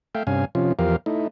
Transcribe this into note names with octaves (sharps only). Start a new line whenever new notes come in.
A3 E5 F5 G5
G2 C3 C#4 F5 G#5
C3 F3 C#4 F4
E2 F3 G4 A#4 F5
A3 D#4 E4